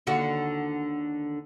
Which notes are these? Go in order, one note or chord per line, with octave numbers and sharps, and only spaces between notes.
D#2 D3 F#4